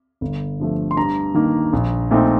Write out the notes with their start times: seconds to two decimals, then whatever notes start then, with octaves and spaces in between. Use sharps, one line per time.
0.21 G1
0.60 G2 F3 A3
0.91 C6
0.97 G2 A#5
1.34 D#3 A#3
1.73 A#1
2.11 A#2 A3 C4 D#4